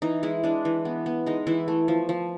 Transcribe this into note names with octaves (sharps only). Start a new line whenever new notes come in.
E3 D#4
G#3 E4
G#3 D4
E3
B3
B3
G#3 D#4
E3 E4
A3
F3
F3